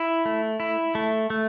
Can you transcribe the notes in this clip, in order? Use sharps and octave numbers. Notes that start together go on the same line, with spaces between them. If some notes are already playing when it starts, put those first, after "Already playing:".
Already playing: E4
A3
E4
A3
A3